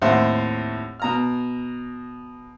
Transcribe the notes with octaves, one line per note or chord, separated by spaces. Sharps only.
D#2 A2 C4 E5 F#5 C6
B2 A#5 F6